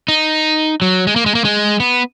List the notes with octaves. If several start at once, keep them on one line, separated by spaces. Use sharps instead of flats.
D#4
F#3
G#3
A#3
G#3
A#3
G#3
B3